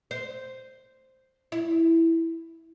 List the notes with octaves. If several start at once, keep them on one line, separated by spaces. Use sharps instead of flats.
C5
E4